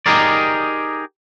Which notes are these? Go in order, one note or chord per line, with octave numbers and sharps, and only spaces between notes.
D#4 G4 G#4 A#4 D5